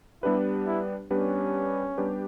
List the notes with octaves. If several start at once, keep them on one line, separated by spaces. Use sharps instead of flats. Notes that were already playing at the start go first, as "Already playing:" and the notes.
G3 B3 D4 E4 G4 B4
E4
G3 B3 C#4 D4 G4 B4
G3 B3 D4 G4 B4